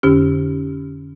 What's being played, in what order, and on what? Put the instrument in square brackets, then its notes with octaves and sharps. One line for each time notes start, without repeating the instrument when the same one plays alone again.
[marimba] F2 D3 C#4 G4